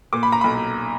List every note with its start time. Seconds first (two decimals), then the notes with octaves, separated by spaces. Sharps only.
0.13 A#2 D6
0.23 B5
0.32 A#5
0.41 B1 B5